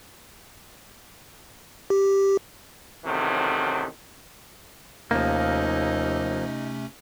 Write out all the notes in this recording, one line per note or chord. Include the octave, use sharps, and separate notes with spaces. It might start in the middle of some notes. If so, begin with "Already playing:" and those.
G4
A1 E2 C3 D#3 F#3 A4
D#2 C3 F3 A3 A#3 C#4 D#4